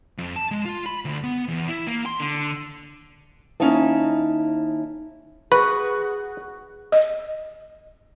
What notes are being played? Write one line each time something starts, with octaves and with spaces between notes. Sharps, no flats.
F2
A5
G#3
F4
B5
D2
B3
E2
E4
A#3
C6
D3
D#2 C#4 D#4 E4 D#5 A5
F#4 G#4 B4
D#5